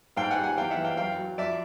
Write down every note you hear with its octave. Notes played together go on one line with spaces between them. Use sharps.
G#2 F5 G5
F#5 G#5
G3
F#5 G#5
E2 F5 G5
E5 F#5
E3
F5 G5
F#2 F5 G5
F#3
F2 D5 E5